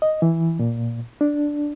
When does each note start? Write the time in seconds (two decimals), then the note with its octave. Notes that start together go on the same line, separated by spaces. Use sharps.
0.02 D#5
0.22 E3
0.59 A#2
1.21 D4